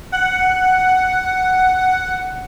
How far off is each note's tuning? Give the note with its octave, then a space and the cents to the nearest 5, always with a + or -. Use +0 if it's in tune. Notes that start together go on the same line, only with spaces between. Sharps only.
F#5 +5